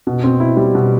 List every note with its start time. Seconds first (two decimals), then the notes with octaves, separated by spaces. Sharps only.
0.07 B2
0.24 C4
0.40 E4
0.57 G3
0.75 B2